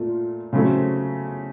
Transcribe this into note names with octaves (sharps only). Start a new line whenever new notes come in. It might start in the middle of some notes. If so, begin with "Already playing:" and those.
Already playing: A#2 A3 F4
C#3 F#3 A3 C4